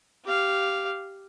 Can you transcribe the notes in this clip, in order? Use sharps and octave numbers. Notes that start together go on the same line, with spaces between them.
G4 F5